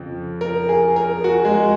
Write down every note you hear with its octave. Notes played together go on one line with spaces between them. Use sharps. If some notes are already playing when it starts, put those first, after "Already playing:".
Already playing: F2 C#3 F3
A#4
G#4
A#4
F#4
G#3